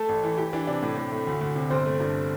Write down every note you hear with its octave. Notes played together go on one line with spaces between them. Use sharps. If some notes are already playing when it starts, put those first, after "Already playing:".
Already playing: A3 A4 A5
A1
E3
E3 G4 G5
E3 D4 D5
C3 D4 D5
A2
A2
A3
D2
D2
C3
G1 C4 C5
A3
G2